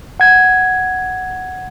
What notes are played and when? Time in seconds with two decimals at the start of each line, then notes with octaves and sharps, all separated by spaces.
0.20 F#5 G#6